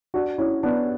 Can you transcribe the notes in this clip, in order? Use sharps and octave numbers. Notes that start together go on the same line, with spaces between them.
D4 F#4
C#4 E4
B3 D4